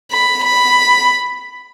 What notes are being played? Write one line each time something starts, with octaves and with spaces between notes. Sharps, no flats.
B5
B5